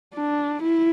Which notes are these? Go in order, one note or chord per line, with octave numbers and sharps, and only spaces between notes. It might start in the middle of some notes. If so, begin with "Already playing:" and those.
D4
E4